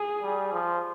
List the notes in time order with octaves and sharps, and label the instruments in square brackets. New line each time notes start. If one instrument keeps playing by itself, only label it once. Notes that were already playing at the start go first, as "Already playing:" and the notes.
Already playing: [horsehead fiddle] G#4
[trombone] G3
F3